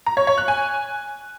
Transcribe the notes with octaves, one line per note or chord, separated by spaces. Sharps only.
A#5
C#5
C#5
F#6
G#5